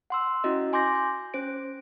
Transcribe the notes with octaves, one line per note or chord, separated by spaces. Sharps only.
F#5 C6 E6
C#4 E4 F#4 D#5
G#5 C6 D6 G6 A#6
G6
C#4 C5 D7